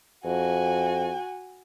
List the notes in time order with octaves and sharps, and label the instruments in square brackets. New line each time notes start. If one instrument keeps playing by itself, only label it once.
[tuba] F2 [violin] F#4 G#5